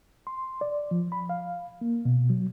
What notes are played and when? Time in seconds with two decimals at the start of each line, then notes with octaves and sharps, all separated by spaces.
0.27 C6
0.61 D5
0.91 F3
1.12 B5
1.29 F5
1.81 A#3
2.05 B2
2.30 F#3